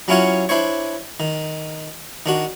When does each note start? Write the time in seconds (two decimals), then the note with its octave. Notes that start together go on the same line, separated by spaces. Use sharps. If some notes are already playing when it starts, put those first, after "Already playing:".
0.08 F#3 C#4 E4 F4 C#5 F#5
0.49 D4 E4 C5 C#5
1.20 D#3
2.26 D#3 D4 F#4